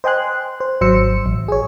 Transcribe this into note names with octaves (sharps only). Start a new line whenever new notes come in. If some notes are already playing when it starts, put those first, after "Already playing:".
C5 D#5 G5 G#5 C6 F#6
C5
G#1 F#3 C5 E6 C#7
A1
G#4 C#5